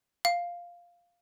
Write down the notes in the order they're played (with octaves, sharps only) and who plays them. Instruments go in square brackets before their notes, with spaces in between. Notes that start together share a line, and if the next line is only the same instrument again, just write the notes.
[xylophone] F5